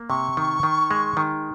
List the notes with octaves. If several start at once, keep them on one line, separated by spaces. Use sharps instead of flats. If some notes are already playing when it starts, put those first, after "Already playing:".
Already playing: A#3
C3 C#6
D#3
D#3
G#3
D#3